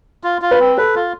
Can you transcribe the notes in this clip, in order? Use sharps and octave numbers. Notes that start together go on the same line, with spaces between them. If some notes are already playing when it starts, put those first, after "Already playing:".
F4
F4
B4
C4
A4 B4
F4